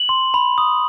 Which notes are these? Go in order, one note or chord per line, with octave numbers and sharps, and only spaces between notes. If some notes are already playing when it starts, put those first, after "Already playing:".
Already playing: F#7
C6
B5
D#6